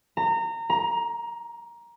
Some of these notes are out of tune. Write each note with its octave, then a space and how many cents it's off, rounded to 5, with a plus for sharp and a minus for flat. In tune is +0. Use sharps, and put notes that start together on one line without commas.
A#5 -25
A#5 +15